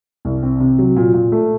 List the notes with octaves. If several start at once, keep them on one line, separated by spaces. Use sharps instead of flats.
C2
C4
C3
F#3
A#2
A#2
A3